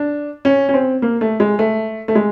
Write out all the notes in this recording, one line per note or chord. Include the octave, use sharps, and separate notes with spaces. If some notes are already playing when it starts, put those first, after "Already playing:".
Already playing: D4
C#4
C#4
C4
A#3
A3
G#3
A3
A3
G#3